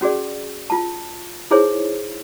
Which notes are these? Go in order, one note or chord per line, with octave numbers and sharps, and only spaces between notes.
C#4 F#4 G#4 D5
F4 A5
D#4 E4 G#4 C5 C#5